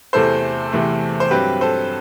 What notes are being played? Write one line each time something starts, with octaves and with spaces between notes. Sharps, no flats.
E2 C3 E3 A3 A4 C5
E2 C3 E3 A3
C5
G2 F#3 C4 G4 B4
A4 C5